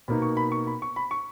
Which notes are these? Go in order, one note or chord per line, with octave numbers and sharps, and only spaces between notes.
B2 A#3 D#4 B5
C#6
B5
C#6
B5
C#6
B5
C#6